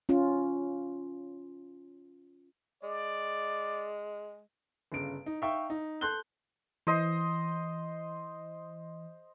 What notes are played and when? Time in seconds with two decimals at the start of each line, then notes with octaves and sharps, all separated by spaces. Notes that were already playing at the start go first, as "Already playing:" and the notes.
0.09 C#4 F4
2.83 G#3 D5
4.92 G1 C#3 D7
5.26 D#4
5.42 D#4 E5 F5 G5 C#6
5.70 D#4
6.01 A4 C6 F#6 G6 G7
6.87 E3 C5 D#5 C6